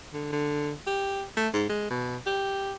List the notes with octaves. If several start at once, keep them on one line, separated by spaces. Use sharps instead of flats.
D3
D3
G4
A3
G#2
G#3
B2
G4